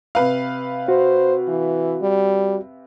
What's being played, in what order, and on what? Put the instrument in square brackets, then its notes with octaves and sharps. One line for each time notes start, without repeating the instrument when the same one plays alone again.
[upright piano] C3 B4 F5
[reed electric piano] F#4 [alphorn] C5
[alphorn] E3
G3